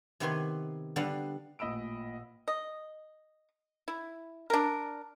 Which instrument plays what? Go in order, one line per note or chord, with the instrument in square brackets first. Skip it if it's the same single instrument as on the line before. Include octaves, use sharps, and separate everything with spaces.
[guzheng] C3 D#3 B3 B4 C#5 C6
D3 G3 B3 F5 F#5
[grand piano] A1 A#2 D#5 B5 E6 D7
[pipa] D#5
E4
D4 A#4